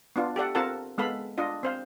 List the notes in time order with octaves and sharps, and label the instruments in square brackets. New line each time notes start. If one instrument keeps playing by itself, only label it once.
[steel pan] B3 D4 F4
G4 A4 D5 F#5
C4 F4 A4 A#4 F#5 A5
G#3 B3 A4 F5 B5
D4 F4 D#5
C4 C5 F5